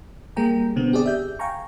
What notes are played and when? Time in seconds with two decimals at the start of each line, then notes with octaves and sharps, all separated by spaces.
0.36 G3 A#3 G#4 G5 A#5
0.76 B2 D3 B3 C4
0.93 G4 G#4 D5
1.06 E5 G6
1.39 F5 G5 G#5 A#5 C#6